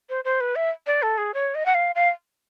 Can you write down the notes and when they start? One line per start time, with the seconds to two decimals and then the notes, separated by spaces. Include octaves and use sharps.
0.10 C5
0.24 C5
0.40 B4
0.56 E5
0.87 D5
1.02 A4
1.18 G#4
1.34 C#5
1.55 D#5
1.66 F#5
1.74 F5
1.95 F5